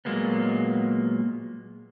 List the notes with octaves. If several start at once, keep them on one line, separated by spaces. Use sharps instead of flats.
A#2 F#3 G#3 A#3 B3